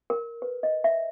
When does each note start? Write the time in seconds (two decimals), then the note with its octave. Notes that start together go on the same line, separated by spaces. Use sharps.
0.10 A#4
0.42 B4
0.63 D#5
0.84 E5